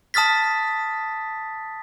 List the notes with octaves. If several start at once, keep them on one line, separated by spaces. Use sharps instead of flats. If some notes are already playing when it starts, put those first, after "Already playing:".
A5 D#6 F6 A6 B6